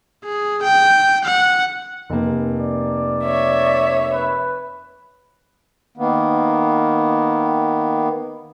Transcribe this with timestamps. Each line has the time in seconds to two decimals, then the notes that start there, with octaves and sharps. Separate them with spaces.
0.24 G#4
0.63 G5
1.25 F#5
2.10 F1 A#3
2.58 D5
3.24 C#5 E5
4.12 B4
5.97 D#3 A#3 B3